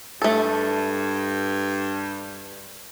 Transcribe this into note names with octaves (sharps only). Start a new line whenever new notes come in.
G2 A3 A4